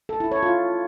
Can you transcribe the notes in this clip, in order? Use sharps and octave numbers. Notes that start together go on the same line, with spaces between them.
A4
E4
C#5
F4